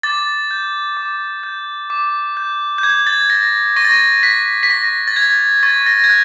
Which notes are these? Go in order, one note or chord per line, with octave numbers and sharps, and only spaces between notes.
D6 A6
G6
D6
G6
D6
G6
G6
D6 G#6
A6
G6 A#6
C#6 A#6
A6
A#6
F#6 B6
B6
C#6 A#6
A6
F#6 G#6
C#6 A6
A#6
G#6
F#6